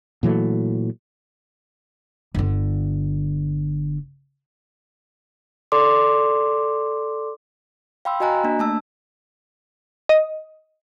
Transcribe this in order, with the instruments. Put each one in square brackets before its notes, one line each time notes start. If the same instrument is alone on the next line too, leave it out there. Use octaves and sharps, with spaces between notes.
[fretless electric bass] A#2 E3 F#3 A3
[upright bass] G1 D3
[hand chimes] A4 D5 C6 D6
F5 G5 B5 C6 E6
F#4 D#5 G#5 A#5 F#6
A#3 D4
A3 A5 E6
[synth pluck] D#5